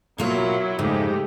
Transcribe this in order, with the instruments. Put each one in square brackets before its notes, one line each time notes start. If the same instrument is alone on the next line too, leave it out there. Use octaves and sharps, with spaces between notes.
[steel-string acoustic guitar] B2 A#3 F4 [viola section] F#3 E4
[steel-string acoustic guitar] F2 G#2 C#3 [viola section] G#3 A3 G4